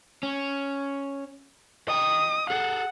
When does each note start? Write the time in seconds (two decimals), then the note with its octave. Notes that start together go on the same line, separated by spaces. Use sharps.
0.23 C#4
1.88 D#5 G5 D#6
2.50 G#4 A4 F#5